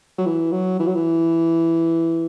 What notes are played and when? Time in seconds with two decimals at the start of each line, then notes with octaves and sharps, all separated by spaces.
0.19 F#3
0.26 E3
0.52 F#3
0.79 E3
0.87 F#3
0.95 E3